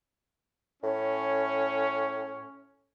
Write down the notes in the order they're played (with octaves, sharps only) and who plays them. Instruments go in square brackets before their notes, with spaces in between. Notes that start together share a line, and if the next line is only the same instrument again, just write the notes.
[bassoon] A2 [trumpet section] C#4